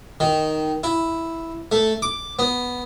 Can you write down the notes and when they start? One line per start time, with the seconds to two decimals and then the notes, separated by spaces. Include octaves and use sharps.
0.20 D#3
0.84 E4
1.72 A3
2.02 D6
2.39 B3